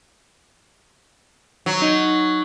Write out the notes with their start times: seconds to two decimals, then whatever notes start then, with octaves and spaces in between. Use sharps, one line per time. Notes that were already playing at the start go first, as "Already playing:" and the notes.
1.66 F#3
1.82 D#4